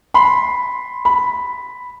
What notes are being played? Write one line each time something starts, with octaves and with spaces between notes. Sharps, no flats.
B5 C6
B5